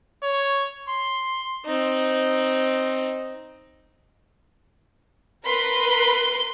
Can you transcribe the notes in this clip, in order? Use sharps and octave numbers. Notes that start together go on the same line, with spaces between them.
C#5
C6
C4 D#4
A#4 B4 B5 C6